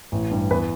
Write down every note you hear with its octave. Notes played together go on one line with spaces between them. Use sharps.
A1
G2
E2 B4